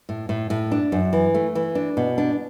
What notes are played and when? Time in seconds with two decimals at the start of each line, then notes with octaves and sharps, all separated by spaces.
0.09 A2
0.29 A2
0.50 A2
0.71 D4
0.92 F#2
1.13 E3
1.34 A3
1.55 E3
1.75 D4
1.97 B2
2.18 D4